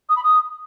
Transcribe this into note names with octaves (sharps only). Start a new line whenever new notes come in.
D#6
B5
D#6